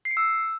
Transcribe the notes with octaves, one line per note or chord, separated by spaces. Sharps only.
C7
C#7
E6